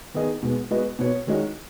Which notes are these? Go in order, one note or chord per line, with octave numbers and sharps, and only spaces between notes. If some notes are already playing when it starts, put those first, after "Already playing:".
D#3 B3 G#4 D#5
B2 G#3 B3
G#3 B3 F#4 B4 D#5
B2 B3 F#4 C#5
D#3 G#3 C#4 F#4 D#5